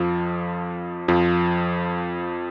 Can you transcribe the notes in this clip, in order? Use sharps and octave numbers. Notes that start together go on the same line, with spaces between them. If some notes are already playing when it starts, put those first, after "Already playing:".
Already playing: F2 F3
F2 F3